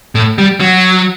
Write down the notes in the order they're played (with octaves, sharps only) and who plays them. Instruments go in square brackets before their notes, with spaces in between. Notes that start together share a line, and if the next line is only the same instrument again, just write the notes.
[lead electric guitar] A2
G3
F#3